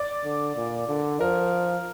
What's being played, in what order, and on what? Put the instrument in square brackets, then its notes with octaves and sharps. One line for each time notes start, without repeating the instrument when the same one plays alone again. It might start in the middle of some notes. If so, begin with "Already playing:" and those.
Already playing: [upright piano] D5
[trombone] D3
A#2
D3
[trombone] F3 [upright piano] A#4